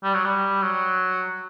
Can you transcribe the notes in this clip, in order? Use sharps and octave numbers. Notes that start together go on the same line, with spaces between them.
G3
F#3
G3
F#3